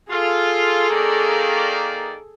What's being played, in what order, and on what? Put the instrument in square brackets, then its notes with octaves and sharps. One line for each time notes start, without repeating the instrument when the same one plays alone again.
[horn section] F4 [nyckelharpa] G#4 A4
[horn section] D#3 A#3 D5